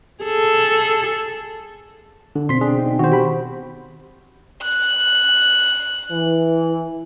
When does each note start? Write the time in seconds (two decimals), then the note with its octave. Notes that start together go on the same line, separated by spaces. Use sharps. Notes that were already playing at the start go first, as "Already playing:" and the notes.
0.23 G#4 A4
2.35 D3 D4
2.49 B2 C4 C6 B6
2.61 D4 G#4
2.78 D#4
2.99 D#3 F#4 C5
3.11 G4 B5
4.62 F#6
6.11 E3